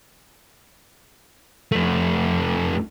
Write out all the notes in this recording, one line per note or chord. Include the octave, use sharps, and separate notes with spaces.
F2 A3